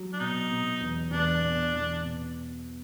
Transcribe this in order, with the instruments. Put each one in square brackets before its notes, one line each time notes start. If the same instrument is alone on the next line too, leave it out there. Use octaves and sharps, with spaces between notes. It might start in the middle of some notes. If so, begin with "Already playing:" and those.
Already playing: [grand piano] F#3
[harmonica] D4
[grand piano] B2 [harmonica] D#4
[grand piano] B2
E2
[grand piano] E2 [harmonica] D4
[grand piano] B2
E2
B2